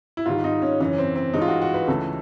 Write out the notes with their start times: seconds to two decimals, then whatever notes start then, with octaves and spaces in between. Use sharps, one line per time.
0.17 E4
0.26 G#2 D#3 G3 F4
0.44 D#4
0.62 C#4
0.80 F#2 C#3 E3 C#4
0.98 C4
1.16 C4
1.34 G2 E3 G#3 D#4
1.42 F4
1.48 F#4
1.62 F#4
1.74 B4
1.88 C#2 C#3 E3 A3 A4